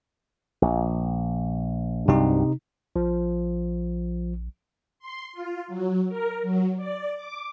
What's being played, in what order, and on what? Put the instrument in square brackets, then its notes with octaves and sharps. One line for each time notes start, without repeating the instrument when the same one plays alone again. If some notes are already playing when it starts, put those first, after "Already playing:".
[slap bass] A#1
[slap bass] C2 G2 F#3 [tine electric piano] C3 D#4
[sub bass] A#1 [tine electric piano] F3
[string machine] C6
F4
F#3
A#4
F#3
D5
D6